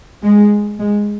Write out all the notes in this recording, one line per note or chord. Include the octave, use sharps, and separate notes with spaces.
G#3
G#3